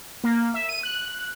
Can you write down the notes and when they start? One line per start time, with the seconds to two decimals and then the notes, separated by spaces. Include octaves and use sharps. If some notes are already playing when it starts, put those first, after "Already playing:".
0.24 A#3
0.54 E5
0.69 D#7
0.83 F#6